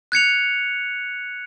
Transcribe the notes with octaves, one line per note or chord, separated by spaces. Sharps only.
F#6 G#6 C#7 F7